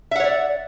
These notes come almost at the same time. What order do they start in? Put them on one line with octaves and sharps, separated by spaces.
E5 F#5 C#5 D5